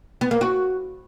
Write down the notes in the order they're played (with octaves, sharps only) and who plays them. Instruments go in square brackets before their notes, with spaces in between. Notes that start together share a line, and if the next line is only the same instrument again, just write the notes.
[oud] B3
A#3
F#4